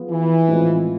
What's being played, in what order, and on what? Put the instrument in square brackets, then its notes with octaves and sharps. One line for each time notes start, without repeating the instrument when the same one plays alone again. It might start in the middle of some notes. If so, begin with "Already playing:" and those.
Already playing: [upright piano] F3 B3 F4 G#4
[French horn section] E3
[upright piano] A2 F3 G#3 C4 F4